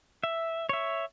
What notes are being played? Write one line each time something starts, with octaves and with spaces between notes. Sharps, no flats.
E5
C#5 E5